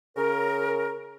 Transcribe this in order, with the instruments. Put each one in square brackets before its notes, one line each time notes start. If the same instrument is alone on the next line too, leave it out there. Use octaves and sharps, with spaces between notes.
[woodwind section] C#3 A#4